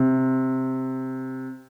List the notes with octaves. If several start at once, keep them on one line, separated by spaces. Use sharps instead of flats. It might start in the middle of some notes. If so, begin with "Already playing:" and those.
Already playing: C3